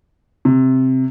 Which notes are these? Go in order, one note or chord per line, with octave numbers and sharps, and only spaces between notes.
C3